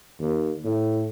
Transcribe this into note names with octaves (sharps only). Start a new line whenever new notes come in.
D#2
A2